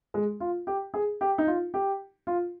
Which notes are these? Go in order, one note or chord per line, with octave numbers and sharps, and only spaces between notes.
G#3
F4
G4
G#4
G4
D#4
F4
G4
F4